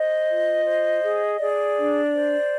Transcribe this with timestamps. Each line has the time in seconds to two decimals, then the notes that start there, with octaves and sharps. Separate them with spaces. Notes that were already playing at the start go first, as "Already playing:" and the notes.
Already playing: C5 D#5
0.28 F4
0.66 C5
1.02 G#4
1.39 G#4 D5
1.76 D4
2.12 C5